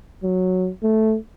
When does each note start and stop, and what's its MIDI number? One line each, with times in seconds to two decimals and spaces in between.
0.23 0.69 54
0.83 1.16 57